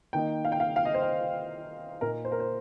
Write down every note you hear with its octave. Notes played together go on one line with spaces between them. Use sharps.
D#3 A#3 D#4 G5
F5
G5
F5
F5
D#5
C5
D#5
A#2 A#3 D#4 A#4
C5
A#4
C5